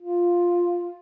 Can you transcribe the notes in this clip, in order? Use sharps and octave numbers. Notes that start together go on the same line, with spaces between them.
F4